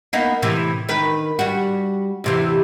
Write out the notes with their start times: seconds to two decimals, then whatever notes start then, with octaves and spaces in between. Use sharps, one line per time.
0.13 A#3 B3 D#4
0.42 A2 C3 E3
0.89 D#3 B4
1.39 G3 F#4
2.24 E2 C3 E3